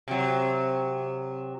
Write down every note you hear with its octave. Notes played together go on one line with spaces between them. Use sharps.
C3 F#3